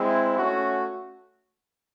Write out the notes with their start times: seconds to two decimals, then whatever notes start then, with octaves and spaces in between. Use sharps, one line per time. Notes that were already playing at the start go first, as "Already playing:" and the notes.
Already playing: G#3 C4 E4
0.37 A3 C#4 F#4